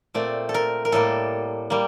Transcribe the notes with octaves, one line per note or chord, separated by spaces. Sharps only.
A#2 A3 C4 D5
A4
A#4
A#4
A2 G3 A#3 A4
G3 A#3